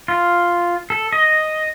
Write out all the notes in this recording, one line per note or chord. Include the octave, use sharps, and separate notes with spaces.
F4
A4
D#5